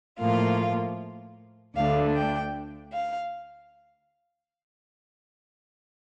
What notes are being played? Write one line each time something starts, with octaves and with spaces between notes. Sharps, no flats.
A2 F3 A#3 F4 F5
D2 D3 A3 D4 F5
G5
F5